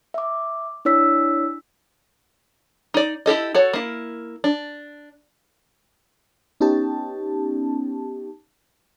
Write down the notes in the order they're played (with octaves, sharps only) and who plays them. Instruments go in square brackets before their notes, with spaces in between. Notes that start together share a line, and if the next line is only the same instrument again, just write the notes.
[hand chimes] E5 D6
D4 E4 C#5 E6 B6
[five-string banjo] D#4 D5
E4 G4 A4 D#5
F#4 A4 C#5
A#3 E4
D4
[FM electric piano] B3 C#4 D#4 G4 A5